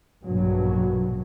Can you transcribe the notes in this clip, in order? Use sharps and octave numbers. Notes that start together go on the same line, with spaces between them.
A#1 G2 B2 F#3